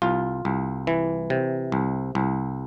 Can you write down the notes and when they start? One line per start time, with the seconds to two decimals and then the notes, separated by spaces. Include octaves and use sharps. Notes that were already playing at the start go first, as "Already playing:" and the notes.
0.02 C2 F4
0.45 C2
0.87 E3
1.30 C3
1.72 C2
2.15 C2